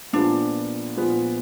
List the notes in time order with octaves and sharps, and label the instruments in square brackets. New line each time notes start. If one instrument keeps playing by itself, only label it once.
[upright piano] A#2 F3 B3 F4 G#4 [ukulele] D4
[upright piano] A#2 F3 B3 F4 G#4